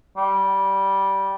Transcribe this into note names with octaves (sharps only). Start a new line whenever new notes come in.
G3